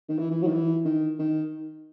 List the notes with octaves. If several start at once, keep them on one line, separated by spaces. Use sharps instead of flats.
D#3
E3
E3
F#3
D#3
E3
D#3
D#3